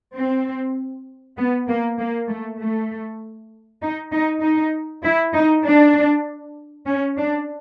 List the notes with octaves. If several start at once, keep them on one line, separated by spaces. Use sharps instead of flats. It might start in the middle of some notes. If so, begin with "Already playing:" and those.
C4
B3
A#3
A#3
A3
A3
D#4
D#4
D#4
E4
D#4
D4
C#4
D4